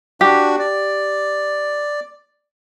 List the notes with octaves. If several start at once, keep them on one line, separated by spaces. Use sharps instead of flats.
D4 F#4 G4
D5